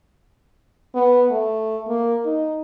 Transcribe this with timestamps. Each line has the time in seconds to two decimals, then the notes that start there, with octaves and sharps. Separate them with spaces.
0.95 B3
1.31 A3
1.88 A#3
2.25 D#4